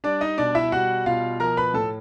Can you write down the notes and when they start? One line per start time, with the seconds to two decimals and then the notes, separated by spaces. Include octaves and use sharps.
0.04 G3 D4 D5
0.21 D#4 D#5
0.38 B2 D4 D5
0.55 E4 E5
0.72 G3 F#4 F#5
1.06 B2 F4 F5
1.40 F3 A#4 A#5
1.57 B4 B5
1.74 A2 A4 A5